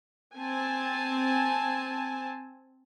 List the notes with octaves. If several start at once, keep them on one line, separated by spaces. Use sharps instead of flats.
C4 G#5 A5